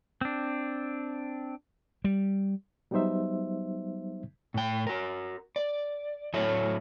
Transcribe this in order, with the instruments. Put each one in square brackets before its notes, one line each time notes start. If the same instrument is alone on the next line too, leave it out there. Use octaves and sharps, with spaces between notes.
[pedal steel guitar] C4 D4
[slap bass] G3
[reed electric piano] F#3 G3 B3 D#4 C5 E5
[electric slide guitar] A2 G5
F#4 A#4
D5
A2 F#3 A3 C#5 E5